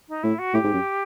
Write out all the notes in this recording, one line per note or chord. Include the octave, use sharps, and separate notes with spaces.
D#4
A2 E4
F#4
A2 G4
G#2
F#2